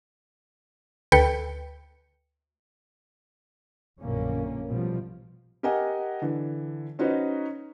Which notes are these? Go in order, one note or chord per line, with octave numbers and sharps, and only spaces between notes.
D2 A4 B4 G5 C#7
A#1 F#2 B2 D3 A#3 C#4
B2 F3 G3
G4 A#4 D#5 F#5 G#5
D3 E3
C#4 D#4 F#4 B4 C5 D#5